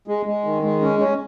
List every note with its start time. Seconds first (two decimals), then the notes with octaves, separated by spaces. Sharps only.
0.08 G#3
0.26 G#3
0.45 D#3
0.62 G#3
0.82 C#4
0.99 C#4